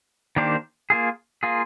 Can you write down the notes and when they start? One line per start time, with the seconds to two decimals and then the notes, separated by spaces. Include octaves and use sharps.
0.36 D#3 A#3 D4 G4 C5
0.90 A#3 F4 G#4
1.43 A#3 F4 G#4